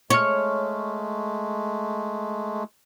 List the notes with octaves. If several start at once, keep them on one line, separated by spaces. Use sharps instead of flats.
G#3 A3 C#5 C#6 F6